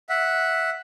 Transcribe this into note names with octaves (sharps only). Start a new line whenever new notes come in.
E5 F#5